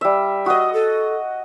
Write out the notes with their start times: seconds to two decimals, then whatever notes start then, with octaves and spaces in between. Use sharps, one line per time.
0.01 G3 E5
0.46 F#4 D#5 D#6
0.73 A4